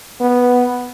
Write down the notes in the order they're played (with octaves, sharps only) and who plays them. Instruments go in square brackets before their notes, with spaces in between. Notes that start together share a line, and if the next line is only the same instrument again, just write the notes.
[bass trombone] B3